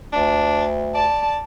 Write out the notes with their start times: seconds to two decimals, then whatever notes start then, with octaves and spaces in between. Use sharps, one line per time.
0.12 D2 D4
0.95 D5 A5